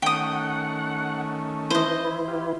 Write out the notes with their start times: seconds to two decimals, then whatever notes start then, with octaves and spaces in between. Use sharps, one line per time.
0.02 D#3 A3 C#4 F#5 G5 D#6
1.70 E3 E4 C5 D#5
2.28 F4 G4